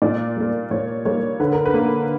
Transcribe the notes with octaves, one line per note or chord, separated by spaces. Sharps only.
A#2 D5
G3 A#3
A#2 C#5
G3 A#3 C#5
D3 B4
A#4
B4
A#3